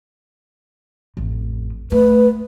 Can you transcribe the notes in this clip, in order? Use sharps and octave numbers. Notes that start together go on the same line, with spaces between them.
A1 F2
A3 B4